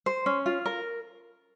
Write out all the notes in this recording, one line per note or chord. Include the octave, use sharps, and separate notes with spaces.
C5
C#4
F4
A#4